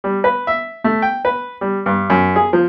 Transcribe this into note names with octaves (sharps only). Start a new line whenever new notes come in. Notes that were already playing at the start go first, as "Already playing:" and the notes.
G3
B4
E5
A3
G5
B4
G3
G2
F#2
G#4
F3